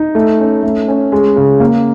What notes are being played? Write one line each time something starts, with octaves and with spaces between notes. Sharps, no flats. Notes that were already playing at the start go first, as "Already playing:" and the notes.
Already playing: D#4
A3
C#4
A3
C#4
G#3
C#3
A#3